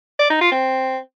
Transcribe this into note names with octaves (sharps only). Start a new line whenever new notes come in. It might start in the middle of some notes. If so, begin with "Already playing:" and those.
D5
D#4
F4
C4